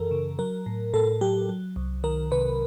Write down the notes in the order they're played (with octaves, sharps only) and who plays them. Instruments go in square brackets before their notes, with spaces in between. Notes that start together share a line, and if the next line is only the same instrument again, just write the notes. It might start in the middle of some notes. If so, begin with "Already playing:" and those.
Already playing: [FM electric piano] F#2 E3 A4 A#4
C#3
F#3 A#4
A2
A2 A4
F#3 G4
F#3
C2
D#3 A#4
C3 B4